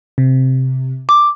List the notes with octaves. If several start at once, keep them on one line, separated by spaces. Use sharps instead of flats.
C3
D6